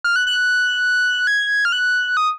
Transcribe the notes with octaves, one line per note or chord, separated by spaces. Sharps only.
F6
F#6
F#6
G#6
F6
F#6
D#6